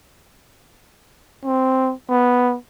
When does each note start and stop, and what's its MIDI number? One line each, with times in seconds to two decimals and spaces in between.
1.45 1.93 60
2.09 2.56 59